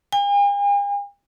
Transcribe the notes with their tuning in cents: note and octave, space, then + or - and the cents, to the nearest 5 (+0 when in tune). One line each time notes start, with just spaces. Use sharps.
G#5 -45